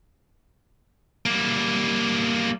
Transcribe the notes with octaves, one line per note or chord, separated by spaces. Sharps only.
G3 A#3